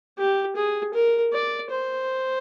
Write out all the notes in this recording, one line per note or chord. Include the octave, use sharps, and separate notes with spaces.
G4
G#4
A#4
D5
C5